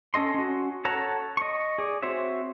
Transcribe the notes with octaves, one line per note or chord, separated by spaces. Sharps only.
C#4 A4 D#5 C6
C#4 F#4
A4 C#5 F#5 A5 A#5
D#5 C#6
G#4 D5
C4 F#4 C5 C#5 E5